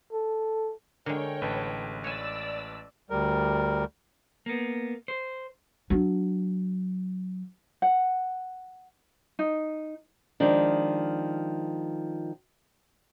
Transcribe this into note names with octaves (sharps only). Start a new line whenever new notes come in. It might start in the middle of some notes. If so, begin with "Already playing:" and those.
A4
D3 G#3 A#4 C#5 G5
A1 B4 A5
C#5 D5 G#5 E6
D2 G3 A#4
A#3 B3
C5
F#3 D4
F#5
D#4
D#3 F3 G#3 D4